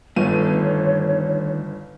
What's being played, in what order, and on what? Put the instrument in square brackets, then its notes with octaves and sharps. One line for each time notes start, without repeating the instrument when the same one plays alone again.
[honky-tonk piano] G1 D#7 [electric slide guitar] D3 D#3 A3 [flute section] C#5